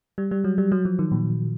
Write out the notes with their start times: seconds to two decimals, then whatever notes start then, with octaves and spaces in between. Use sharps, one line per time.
0.18 G3
0.31 G3
0.44 F#3
0.58 G3
0.72 F#3
0.85 F3
0.99 D#3
1.11 A#2